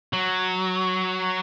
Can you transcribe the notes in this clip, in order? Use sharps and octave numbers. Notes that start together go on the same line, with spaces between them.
F#3